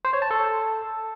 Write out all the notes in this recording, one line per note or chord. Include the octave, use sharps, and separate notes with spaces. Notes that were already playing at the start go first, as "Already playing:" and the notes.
C5
C#5
A5
A4